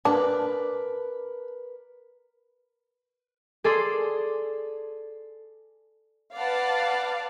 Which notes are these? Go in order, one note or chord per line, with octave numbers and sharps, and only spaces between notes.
D4 A#4 B4
G#4 A4 D5 C6
B4 D5 F5 F#5 A5